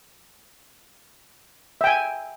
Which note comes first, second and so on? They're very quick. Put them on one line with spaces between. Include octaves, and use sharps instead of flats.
E5 G5 G#5